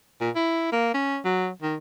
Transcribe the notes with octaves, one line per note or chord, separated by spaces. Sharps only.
A#2
E4
A#3
C#4
F#3
D#3